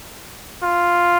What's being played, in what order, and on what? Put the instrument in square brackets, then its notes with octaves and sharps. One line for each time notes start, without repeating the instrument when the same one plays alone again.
[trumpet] F4